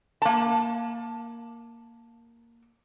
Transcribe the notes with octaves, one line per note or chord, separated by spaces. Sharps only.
A#3 A5